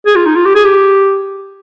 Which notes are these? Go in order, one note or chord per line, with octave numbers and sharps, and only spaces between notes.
G#4
F4
D#4
F4
G4
G#4
G4